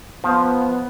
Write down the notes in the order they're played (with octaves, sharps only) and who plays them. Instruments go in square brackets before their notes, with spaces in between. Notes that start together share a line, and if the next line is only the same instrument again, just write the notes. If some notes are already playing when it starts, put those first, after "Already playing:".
[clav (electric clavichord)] F3 [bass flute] B3